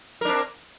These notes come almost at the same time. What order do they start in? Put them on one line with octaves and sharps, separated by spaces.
A#4 D4 C4